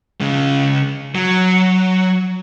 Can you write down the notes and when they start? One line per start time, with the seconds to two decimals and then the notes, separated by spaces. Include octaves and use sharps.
0.20 C#3 G#3
1.15 F#3